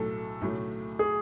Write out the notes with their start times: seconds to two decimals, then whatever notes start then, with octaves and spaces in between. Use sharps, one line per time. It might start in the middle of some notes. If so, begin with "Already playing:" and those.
Already playing: B1 A2 F#3 A3 A4
0.41 B1 A2 F#3 A3
0.99 G#4